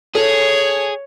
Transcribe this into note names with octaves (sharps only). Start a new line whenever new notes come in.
G#4 A4 C#5